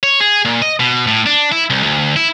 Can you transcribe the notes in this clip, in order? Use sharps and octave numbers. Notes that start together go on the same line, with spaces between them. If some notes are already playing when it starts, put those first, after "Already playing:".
C#5
G#4
A#2
D#5
B2
A2
D4
E4
C2
D2
E4